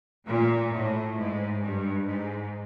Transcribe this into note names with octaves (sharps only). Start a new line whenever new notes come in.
A#2
A2
G#2
G2
G#2